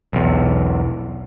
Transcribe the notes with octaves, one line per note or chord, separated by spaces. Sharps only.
B1 E2